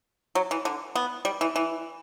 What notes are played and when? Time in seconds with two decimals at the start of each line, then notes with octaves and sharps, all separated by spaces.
0.35 F#3
0.51 E3
0.65 D3
0.95 B3
1.25 G3
1.41 E3
1.56 E3